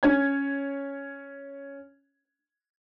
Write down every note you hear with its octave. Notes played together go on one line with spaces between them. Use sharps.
C#4 C#5 G#6